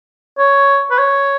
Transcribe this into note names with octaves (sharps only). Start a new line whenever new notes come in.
C#5
B4
C#5